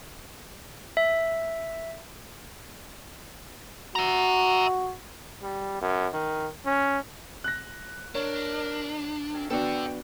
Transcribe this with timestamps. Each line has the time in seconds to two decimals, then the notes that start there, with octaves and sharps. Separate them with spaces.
0.97 E5
3.96 F#4 E5 A#5
5.43 G3
5.81 F#2
6.13 D#3
6.66 C#4
7.44 F#6 A#6
8.15 D4 A#4 C#5
9.33 D2 C4 C#4
9.51 B3 D4 F#4 A4 D5 G5